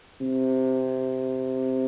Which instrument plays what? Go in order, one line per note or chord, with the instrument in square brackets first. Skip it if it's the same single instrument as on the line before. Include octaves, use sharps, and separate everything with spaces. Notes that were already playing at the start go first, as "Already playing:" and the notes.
[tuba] C3